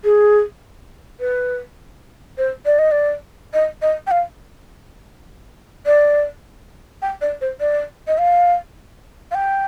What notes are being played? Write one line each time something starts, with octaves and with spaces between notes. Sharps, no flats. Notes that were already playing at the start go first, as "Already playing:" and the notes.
G#4
B4
C5
D5
D#5
D5
D#5
D#5
G5
F5
D5
G5
D5
C5
D5
D#5
F5
F5
G5